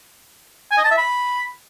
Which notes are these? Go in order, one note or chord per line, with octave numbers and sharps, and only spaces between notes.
G#5
D#5
A5
E5
B5